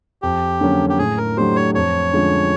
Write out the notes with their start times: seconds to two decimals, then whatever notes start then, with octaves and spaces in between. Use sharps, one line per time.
0.22 F2 G4
0.61 D3 F#3 A#3 C#4
0.90 G4
0.99 A2 G#4
1.17 A#4
1.37 F#3 A3 D4 G4 C5
1.56 C#5
1.75 F2 C#5
2.13 D3 F3 G#3 C#4